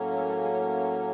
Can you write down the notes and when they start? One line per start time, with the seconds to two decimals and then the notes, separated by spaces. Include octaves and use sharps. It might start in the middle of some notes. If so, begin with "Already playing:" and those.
Already playing: A2 F#3 A#3 C#4
0.14 A3 A4
0.28 A3 A4
0.42 G#3 G#4